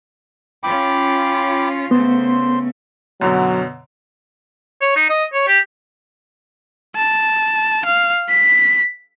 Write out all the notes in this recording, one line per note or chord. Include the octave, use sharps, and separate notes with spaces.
C#4 F4 G5 B5 D6
C#3 A3 B3 C5 C6
F#2 B2 D3 F#3
C#5
D#4
D#5
C#5
G4
A5
F5
B6